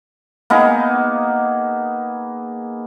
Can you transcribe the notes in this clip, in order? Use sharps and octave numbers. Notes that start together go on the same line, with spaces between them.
A#3 B3 D#4 G#4